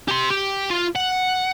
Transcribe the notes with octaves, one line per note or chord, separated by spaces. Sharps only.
G4 C6
G4
F4
F#5